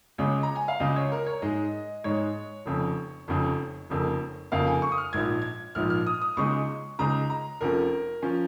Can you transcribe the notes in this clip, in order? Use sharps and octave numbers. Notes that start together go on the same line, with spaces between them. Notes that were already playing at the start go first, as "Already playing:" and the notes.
C#2 C#3 G#3 C#5
A#5
G#5
F5
C#2 C#3 G#3 D#5
C#5
A#4
C#5
G#2 G#3 D#4 D#5
G#2 G#3 D#4 C#5
F1 F2 C#3
F1 F2 C#3
F1 F2 C#3 A#3
F1 F2 C#3 A#3 F5
G#5
C#6
D#6
F6
A#1 G#2 F3 G#6
G#6
A#1 G#2 F3 F6
F6
D#6
D#6
C#2 C#3 G#3 D#4 C#6
C#2 C#3 G#3 D#4 A#5
A#5
F1 F2 F3 C#4 A#4
F3 C#4